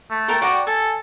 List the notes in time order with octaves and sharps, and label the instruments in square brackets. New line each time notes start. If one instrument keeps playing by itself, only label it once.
[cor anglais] A3
[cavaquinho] A4 A#4 G5
[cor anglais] F#4 [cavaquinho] D5 G5 A#5
[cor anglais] A4 [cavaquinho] G#5